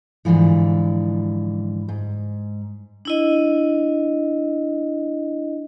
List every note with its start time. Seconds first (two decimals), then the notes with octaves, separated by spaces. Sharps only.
0.25 G#2 B2 D3 E3 F3
1.89 G#2
3.05 D4 E4 D#5